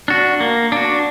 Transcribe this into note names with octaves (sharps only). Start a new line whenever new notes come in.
D4 F#4
A#3
D4 F#4